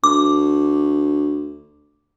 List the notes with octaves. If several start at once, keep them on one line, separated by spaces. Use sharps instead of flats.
D2 D6